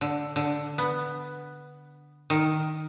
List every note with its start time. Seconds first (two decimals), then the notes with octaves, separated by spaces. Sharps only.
0.01 D3
0.36 D3
0.78 B3
2.30 D#3